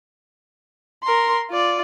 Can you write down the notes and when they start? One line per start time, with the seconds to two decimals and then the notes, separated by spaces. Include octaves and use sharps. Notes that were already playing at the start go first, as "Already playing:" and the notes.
1.03 A#4 C6
1.51 F4 D5